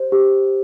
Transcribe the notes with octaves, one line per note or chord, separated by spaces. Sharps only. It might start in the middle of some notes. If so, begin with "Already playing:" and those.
Already playing: G4 C5
G4